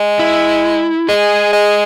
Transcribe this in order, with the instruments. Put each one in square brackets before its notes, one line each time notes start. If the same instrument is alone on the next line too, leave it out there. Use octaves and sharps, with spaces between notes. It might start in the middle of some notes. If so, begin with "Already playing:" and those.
Already playing: [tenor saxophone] G#3
[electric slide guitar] E4
[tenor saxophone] G#3 [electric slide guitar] G#4
[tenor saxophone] G#3